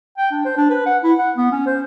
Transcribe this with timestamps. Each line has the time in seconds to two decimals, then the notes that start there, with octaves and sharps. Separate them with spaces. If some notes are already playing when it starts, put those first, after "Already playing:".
0.18 G5
0.31 D4
0.45 C5
0.57 D4
0.70 B4
0.86 F#5
1.04 E4
1.19 F#5
1.37 B3
1.52 C#4
1.67 C5